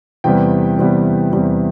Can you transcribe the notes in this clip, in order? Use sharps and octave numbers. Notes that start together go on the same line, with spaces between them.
E2 C3 G3 B3 G5
E2 C3 G3 B3
E2 C3 G3 B3